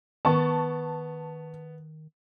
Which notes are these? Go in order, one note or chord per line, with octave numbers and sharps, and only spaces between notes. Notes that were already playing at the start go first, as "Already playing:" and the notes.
D#3 B3 A5 C#6